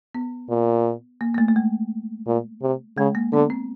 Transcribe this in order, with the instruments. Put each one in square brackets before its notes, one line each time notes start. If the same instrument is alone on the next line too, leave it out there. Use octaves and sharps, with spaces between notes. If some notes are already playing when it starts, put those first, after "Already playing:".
[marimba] B3
[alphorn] A#2
[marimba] A#3
A#3
A3
A3
G#3
[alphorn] A#2
C3
[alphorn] C#3 [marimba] G#3
[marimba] A#3
[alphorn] D3 [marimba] B3
[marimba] C4